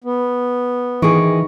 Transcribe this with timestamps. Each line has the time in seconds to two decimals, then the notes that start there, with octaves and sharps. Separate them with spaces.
0.04 B3
1.02 D#3 E3 G#4 C#6 D6